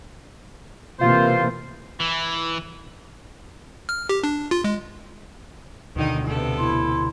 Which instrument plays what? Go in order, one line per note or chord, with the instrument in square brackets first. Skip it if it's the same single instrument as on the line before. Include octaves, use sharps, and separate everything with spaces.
[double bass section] C3 E3 A#3 [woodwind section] F4 C5
[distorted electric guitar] E3
[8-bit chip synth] F6
G4
D4
F4
G#3
[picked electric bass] D2 B2 D3 [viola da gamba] D#3 D#4
[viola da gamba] C3 B3 A4
[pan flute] E4 [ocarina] C6